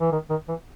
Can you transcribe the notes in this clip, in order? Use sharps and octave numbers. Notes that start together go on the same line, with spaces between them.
E3
D#3
D#3
E3